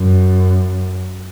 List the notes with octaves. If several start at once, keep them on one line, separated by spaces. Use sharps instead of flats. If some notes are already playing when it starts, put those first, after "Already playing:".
Already playing: F#2